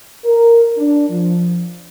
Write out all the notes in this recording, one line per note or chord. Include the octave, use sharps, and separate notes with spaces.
A#4
D4
F3